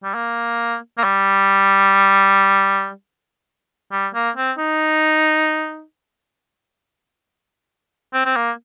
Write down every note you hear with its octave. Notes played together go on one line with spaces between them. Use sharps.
G3
A#3
A#3
G3
G3
A#3
C4
D#4
C4
C4
A#3